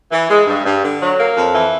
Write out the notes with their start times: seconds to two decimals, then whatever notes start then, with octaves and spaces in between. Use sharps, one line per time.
0.11 E3
0.29 G#3
0.46 G2
0.65 G2
0.82 D3
1.00 F#3
1.18 A#3
1.35 F2
1.54 E3